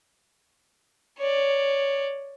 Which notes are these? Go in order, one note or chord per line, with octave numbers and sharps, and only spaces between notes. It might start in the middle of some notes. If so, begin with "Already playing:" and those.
C#5 D5